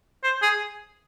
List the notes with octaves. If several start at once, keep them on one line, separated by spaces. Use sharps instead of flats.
C5
G#4